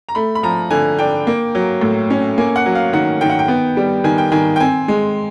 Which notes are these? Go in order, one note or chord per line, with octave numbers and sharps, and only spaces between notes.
A#5
A3 B5
B5
F3 A#5
D3 G#5
D4 G5
A#3
F#3
A2
C#4
A#3 G#5
F#5
F#3
F5
D#3 F#5
D#3 G5
F#5
G5
B3
G3
D#3 G#5
G5
D#3 G#5
G5
C4 G#5
G#3